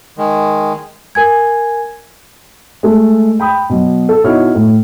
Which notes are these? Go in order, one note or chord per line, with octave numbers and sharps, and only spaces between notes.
D#3 G#3
A#4 G#5 G#6
G#3 A3
G5 B5 D#6
B2 F#3
A4
B2 D#4 E4 F#4 C#5 F6
A2